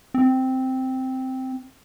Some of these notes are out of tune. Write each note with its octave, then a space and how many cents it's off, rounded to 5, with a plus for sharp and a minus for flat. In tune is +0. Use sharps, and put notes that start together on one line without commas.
C4 -5